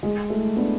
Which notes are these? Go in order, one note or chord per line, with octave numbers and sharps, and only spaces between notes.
G#3
A3
B3 D4